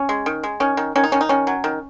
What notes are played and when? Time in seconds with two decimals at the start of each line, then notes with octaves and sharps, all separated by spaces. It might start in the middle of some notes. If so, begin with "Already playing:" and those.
Already playing: C#4
0.09 G#3
0.26 D#3
0.43 G#3
0.60 D#3 C#4
0.77 D#3
0.96 D#3 C#4
1.04 D#4
1.12 D#3 C#4
1.21 D#4
1.29 D#3 C#4
1.47 F#3
1.64 D#3